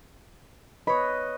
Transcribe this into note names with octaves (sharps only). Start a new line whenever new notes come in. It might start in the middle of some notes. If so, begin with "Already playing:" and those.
B4 C#5 D#5 B5